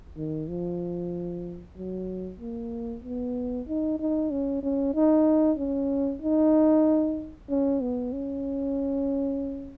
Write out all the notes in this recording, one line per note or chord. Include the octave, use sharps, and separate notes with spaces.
D#3
F3
F#3
A#3
B3
D#4
D#4
C#4
C#4
D#4
C#4
D#4
C#4
B3
C#4